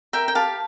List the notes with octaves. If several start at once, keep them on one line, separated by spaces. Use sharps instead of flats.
A#4 E5 G5
G5
G4 F5 A5